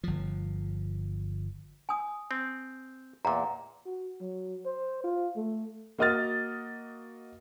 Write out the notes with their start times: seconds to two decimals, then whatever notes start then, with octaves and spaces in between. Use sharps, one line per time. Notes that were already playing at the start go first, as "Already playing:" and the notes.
0.04 G1 F3
1.89 G#5 D#6
2.31 C4
3.25 E2 A#2 A#5
3.86 F#4
4.21 F#3
4.65 C5
5.04 F4
5.36 A3
5.99 A#3 F#4 D#5 D#6 F6 A6